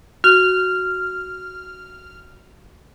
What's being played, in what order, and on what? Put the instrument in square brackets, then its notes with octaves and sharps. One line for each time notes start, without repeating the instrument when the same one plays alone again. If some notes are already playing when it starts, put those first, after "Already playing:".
[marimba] F#4 [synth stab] F6